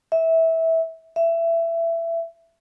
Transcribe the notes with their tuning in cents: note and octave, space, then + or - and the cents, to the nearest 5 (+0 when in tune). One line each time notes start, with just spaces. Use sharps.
E5 -20
E5 +20